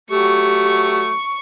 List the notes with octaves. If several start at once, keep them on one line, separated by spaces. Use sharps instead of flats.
F#3 A3 G4 C#6